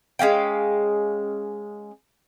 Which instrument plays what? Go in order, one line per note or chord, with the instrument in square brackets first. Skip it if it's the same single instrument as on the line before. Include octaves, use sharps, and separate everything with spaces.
[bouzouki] G#3 C#4 F5 G5